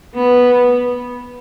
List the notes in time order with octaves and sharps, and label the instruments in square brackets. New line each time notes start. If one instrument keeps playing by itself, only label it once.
[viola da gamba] B3